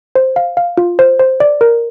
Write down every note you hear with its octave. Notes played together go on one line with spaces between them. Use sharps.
C5
F5
F5
F4
C5
C5
D5
A#4